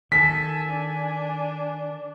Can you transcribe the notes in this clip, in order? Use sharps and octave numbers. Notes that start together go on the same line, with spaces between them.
D#3 A4 G#5 B6
D4